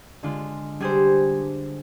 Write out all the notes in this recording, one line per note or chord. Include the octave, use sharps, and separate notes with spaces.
D3 G#3 D4 F4
G3 D4 G#4 C5